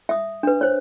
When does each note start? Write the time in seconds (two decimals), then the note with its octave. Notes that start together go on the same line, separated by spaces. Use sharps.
0.09 E5 D#6
0.43 D4 B4
0.61 C5 C#5